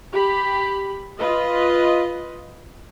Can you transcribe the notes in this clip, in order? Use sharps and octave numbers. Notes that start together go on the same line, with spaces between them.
G4 B5
F4 B4 D#5